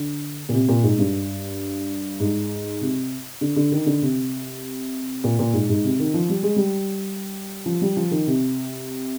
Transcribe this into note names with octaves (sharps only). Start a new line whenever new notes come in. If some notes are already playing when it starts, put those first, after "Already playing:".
Already playing: D3
A#2
C3
A#2
G#2
G2
G#2
C3
D3
D3
D#3
D3
C3
A#2
A#2
G#2
G#2
C3
D#3
F3
G3
G#3
G3
F3
G3
F3
D#3
C3